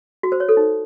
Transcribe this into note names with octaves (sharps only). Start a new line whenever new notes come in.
F#4
C5
C#5
A4
D#4